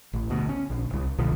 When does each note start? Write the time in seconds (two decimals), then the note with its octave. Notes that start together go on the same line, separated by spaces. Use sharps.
0.13 A1
0.30 D2 B2
0.49 C#4
0.70 A#1
0.90 D1 C2
1.19 C2 B2 D3 F3